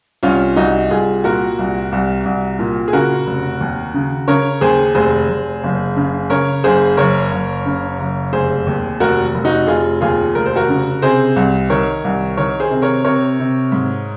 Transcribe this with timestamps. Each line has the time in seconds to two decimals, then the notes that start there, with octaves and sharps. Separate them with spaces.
0.23 C2 C#4 F4
0.56 C2 D#4 F#4
0.90 C2 F4 G#4
1.24 A#2 F#4 A#4
1.59 C2
1.92 C2
2.26 C2
2.59 A#2
2.88 G#4
2.93 C#3 F#4 A#4
3.26 F1
3.61 D#2
3.94 C#3
4.28 C#3 A#4 C#5
4.61 D#2 G#4 C5
4.95 F1 G#4 C5
5.29 F1
5.63 F#1
5.97 C#3
6.30 C#3 A#4 C#5
6.64 F#1 G#4 C5
6.97 F#1 A#4 C#5
7.31 F#1
7.66 C#3
7.99 F#1
8.33 F1 G#4 C5
8.67 D#2
9.00 F1 F#4 A#4
9.35 F1
9.45 D#4 F#4
9.67 F1 F4 G#4
10.01 D#2 F4 G#4
10.35 F1 A#4
10.46 C5
10.56 F#4 A#4
10.69 C#3
11.02 C3 G#4 C5
11.36 C2
11.70 D#3 A#4 C#5
12.04 C2
12.37 D#3 A#4 C#5
12.60 G#4 C5
12.71 C3
12.82 A#4 C#5
13.04 C3 A#4 C#5
13.39 C3
13.72 G#2